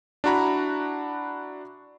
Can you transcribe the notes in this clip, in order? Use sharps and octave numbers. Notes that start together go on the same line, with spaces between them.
D4 E4 F#4 A#5 B5